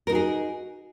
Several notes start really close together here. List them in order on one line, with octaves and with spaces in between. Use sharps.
A#4 D#4 F#4 G#4